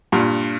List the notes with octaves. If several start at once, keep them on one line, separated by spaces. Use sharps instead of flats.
G2 A#2